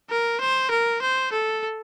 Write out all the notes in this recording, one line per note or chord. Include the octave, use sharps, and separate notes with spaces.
A#4
C5
A#4
C5
A4